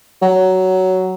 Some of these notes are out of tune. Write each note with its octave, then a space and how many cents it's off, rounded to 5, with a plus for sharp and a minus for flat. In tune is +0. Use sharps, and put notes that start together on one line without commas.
F#3 +10